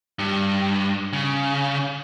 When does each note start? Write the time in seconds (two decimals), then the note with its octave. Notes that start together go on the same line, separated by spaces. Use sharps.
0.19 G2
1.13 C#3